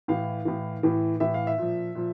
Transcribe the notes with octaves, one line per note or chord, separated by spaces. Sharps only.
A2 E3 F5
A2 E3
A2 E3
A2 E3 E5
F5
E5
A#2 F3
A#2 F3